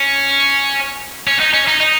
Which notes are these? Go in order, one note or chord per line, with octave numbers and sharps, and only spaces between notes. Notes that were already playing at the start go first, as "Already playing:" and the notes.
Already playing: C#4
C#4
D#4
C#4
D#4
D#4